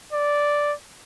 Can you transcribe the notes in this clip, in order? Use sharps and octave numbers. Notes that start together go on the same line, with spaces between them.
D5